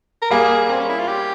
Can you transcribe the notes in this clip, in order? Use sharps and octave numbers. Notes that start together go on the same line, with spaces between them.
A#4
G3 A#3 G#4
C4
C#4
E4
F4
G4